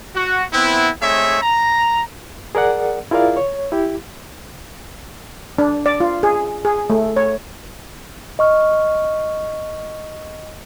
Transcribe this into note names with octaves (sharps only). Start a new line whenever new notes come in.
F#4
B3 C4 E4
A3 C4 D#4 G#4 C#5 E5
A#5
G#4 A#4 D5 F#5
E4 F4 G#4 A#4 D5 F5
C#5
E4 G4
D4
D5
F4
G#4
G#4
A3
C#5
D#5 C#6 F6